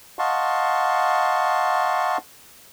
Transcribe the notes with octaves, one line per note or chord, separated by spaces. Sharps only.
D#5 F5 F#5 A5 C6 C#6